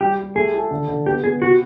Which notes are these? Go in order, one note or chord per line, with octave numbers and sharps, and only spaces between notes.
G3 G4
G4
A3 G#4
A4
D3
D3
B3 G4
B3 G#4
C3 F#4